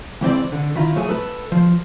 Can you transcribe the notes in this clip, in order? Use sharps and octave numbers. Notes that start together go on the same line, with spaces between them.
C#2 E3 C4 D5
D3
D#3 E4 F4
F#3 A3 G#4
A4 B4
F3